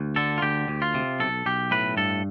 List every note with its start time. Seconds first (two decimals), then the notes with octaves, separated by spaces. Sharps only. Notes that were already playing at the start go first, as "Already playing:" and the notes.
Already playing: D2
0.16 D3 A4
0.38 F4
0.42 D2 G4
0.68 D2
0.82 F4
0.94 C3
1.20 B1 A4
1.46 B1 G4
1.71 A2 B4
1.97 G2 A4